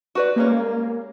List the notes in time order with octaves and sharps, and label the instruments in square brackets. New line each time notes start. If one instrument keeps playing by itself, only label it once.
[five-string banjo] F#4 B4 D5
[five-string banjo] G3 G#3 C#4 [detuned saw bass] A#3